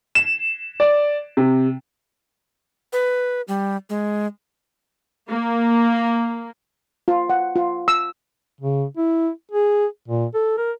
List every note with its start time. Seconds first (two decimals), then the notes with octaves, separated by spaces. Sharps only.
0.15 E7
0.80 D5
1.37 C3
2.93 B4
3.48 G3
3.90 G#3
5.30 A#3
7.08 F4
7.30 F#5
7.56 F4
7.88 E6
8.61 C#3
8.97 E4
9.51 G#4
10.08 A#2
10.34 A4
10.58 A#4